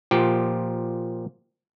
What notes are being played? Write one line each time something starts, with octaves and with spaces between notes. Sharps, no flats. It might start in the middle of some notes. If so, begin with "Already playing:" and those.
A#2 F3 G4